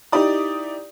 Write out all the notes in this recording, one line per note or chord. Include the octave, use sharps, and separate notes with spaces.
D#4 E4 G4 D5 D#6